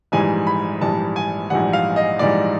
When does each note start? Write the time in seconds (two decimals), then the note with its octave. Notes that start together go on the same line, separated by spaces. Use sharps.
0.12 A#1 G#2 E3 G3 G#5
0.47 B5
0.81 A#1 G#2 E3 G3 A5
1.16 G#5
1.50 A#1 G#2 E3 G3 F#5
1.73 F5
1.96 D#5
2.19 A#1 G#2 E3 G3 D5